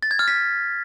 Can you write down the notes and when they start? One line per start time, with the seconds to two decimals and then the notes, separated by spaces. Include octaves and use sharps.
0.03 A6
0.11 G#6
0.19 F6
0.28 B6